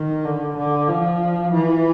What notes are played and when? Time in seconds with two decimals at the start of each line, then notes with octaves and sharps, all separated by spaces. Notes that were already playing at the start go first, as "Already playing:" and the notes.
Already playing: D#3
0.25 D3
0.57 D3
0.89 F3
1.53 E3